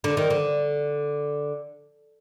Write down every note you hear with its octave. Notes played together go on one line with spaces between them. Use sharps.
D3
D#3
D3